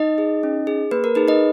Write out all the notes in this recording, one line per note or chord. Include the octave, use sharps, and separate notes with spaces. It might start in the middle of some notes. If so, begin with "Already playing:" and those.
Already playing: D#4 D#5
G#4
C#4
G#4
A#3 B4
A#4
D#4 G#4 B4
D#4 D#5